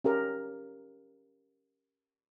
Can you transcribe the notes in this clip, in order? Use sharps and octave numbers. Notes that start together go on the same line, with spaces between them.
C#4 G4 A#4